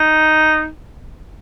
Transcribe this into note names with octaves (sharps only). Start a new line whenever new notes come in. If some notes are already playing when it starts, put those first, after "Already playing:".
Already playing: D#4